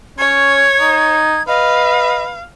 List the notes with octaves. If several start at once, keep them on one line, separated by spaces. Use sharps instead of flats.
C#4 C#5 G#6
D#4
B4 D#5 F5